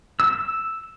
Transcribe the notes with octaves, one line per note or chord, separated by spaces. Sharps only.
E6